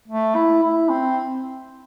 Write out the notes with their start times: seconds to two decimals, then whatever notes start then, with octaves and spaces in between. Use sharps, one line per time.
0.08 A3
0.35 E4
0.62 E4
0.89 C4